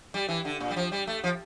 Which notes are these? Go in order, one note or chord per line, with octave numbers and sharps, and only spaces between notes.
G3
E3
D3
A#2
G3
F3
G3
A3
F3